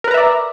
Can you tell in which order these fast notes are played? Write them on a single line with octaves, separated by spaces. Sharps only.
A#4 B4 A#5 E5 D5